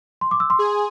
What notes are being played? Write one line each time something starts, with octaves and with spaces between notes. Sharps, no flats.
C6
D6
E6
C6
G#4